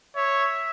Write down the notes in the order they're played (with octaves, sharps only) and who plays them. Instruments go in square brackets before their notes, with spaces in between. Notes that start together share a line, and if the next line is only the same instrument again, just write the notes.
[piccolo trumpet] C#5 [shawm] E5